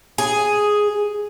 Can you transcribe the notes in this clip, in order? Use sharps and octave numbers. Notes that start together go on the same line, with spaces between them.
G#4